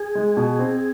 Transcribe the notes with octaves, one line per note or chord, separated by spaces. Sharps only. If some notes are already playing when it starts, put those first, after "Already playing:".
Already playing: G#4
G#3
B2
C4